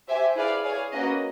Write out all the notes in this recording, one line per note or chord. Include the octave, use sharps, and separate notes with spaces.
G4 C5 E5 G#5
E4 G#4 B4 D5 F5
G#4 C#5 F5
A#3 C#4 F#4 B4 D#5